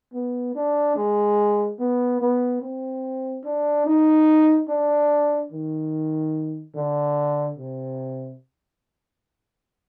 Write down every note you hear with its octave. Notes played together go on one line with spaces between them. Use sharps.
B3
D4
G#3
B3
B3
C4
D4
D#4
D4
D#3
D3
C3